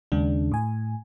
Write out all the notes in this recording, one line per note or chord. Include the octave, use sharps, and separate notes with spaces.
D#2 C#3 G#3 D4
A2 G#5